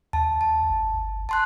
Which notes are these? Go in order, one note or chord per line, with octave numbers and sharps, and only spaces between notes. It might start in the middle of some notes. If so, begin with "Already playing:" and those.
D#2 A5
A5
G1
A5 C6 F#6